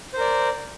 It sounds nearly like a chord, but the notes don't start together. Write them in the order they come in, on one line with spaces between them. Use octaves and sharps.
C5 A#4 D5